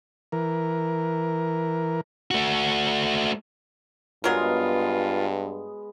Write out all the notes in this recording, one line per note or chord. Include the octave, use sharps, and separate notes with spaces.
E3 A#4
A3 F#4
G2 F#3 G#3 B3 F4 A#4 D#5